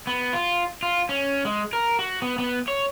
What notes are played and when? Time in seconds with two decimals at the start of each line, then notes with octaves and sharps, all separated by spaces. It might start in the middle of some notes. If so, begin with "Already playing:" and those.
0.07 B3
0.33 F4
0.83 F4
1.09 C#4
1.45 G#3
1.73 A#4
1.99 F#4
2.22 B3
2.39 B3
2.68 C#5